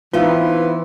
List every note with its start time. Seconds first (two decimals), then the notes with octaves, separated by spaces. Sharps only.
0.14 E3 B3 C4 D#4 F4 B4 F5